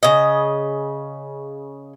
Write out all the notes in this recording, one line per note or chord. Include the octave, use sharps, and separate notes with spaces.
C#3 D#5